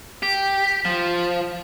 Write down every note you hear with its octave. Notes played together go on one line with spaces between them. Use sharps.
G4
F3